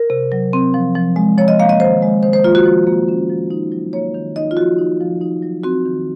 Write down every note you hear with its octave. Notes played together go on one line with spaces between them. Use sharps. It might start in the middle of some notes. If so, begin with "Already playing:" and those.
Already playing: A#4
C3
F#3
C4
F3
F3
G#3
F3 C#5
D#5
A#3 F5
D#5
D#3 C5
G#3
D#3 C5
C5
A#3 F4
F#4
F3
A#3
C#4
F3
D#4
F#3
A#3 C#5
D#3
D#4 D#5
F4
F3 F#4
D#4
F3
D#4
F#3
C4 F#4
D#3